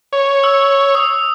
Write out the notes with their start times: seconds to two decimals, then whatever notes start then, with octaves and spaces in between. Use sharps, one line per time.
0.13 C#5
0.44 E6
0.95 D#6